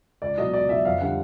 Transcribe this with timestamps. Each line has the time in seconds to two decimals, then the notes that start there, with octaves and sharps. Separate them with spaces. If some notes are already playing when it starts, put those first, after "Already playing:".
0.22 C#2 D5
0.38 B2 F#3 D#5
0.54 C#2 D5
0.69 B2 F#3 E5
0.85 F2 F5
1.01 D3 G3 F#5